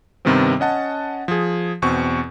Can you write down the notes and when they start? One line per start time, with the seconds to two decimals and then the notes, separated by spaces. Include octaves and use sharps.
0.25 G2 C3 D#3 G3 B3 C4
0.60 C#4 D#5 F#5 A5
1.28 F3 G#4
1.82 E2 B2 C4 C#6